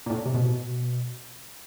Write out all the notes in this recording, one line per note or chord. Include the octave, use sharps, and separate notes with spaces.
A#2
A2
C3
B2